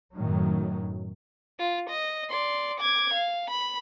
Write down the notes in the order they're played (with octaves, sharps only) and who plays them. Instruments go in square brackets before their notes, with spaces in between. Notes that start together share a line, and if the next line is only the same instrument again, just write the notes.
[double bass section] F#2 A2 D#3 F#3
[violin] F4
D#5
D5 C6
D6 G#6
F5
B5